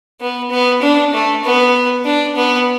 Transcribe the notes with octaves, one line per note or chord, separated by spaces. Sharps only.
B3
B3
D4
A3
B3
D4
B3